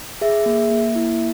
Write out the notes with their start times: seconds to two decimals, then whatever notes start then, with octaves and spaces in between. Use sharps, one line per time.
0.21 G#4 E5
0.46 A#3
0.71 A#3
0.96 E4